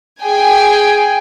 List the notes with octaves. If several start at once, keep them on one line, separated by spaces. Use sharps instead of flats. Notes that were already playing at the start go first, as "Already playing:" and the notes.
G#4 G5 G#5